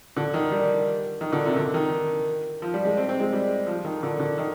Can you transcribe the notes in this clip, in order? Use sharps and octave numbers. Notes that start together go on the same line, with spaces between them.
D3
D#3
G3
D#3
D3
C3
D3
D#3
F3
G3
G#3
C4
C4
G#3
G3
F3
D#3
D3
D3
D#3